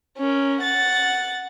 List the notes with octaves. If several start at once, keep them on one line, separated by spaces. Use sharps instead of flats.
C#4 A#4
F#5 A6